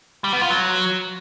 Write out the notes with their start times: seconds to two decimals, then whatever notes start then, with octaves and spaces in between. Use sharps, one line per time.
0.24 G3
0.33 B3
0.42 F4
0.50 F#3